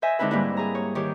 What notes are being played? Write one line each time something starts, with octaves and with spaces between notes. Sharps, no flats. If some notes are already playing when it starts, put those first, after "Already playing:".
C5 D#5 E5 G#5
D3 G#3 C4 D#4 E4 B4
G#2 G3 A#3 E4
G#4 A#5
C#5
D#3 G4 C#5